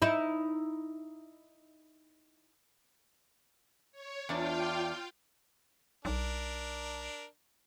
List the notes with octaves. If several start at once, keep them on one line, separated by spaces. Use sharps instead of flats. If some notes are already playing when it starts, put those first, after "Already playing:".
D#4 E4
C#5
E2 D4 F4 D5 F5 G5
B1 D4 A#4